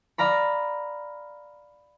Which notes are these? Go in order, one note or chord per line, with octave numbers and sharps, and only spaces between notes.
D5 F5 A#5 B5